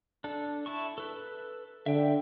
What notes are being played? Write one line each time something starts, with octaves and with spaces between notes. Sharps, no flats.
D4 A4
E4 A5 C#6
A4 B4
D3 E5 G5